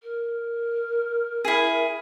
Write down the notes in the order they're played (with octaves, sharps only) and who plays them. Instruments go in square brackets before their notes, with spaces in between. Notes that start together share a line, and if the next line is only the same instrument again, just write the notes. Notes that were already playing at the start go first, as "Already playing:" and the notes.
[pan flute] A#4
[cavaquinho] E4 G#4